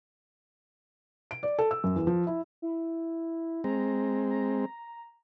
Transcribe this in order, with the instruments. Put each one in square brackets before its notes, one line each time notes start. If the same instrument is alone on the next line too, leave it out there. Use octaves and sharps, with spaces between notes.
[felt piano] D7
D5
A4
E6
F#2
E2
F3
E4
[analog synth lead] E4
[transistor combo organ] G#3 C4 [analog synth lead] A#5
[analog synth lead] A#5